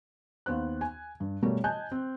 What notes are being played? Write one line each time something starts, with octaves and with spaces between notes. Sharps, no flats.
D#2 B3 C5 F#6
G#5
G2
B2 G3 A3 A#4 C#5
D#5 G#5 A5 F#6 G6
C4